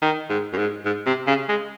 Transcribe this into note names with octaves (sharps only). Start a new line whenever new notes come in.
D#3
G#2
F#2
G#2
G#2
C3
C#3
G#3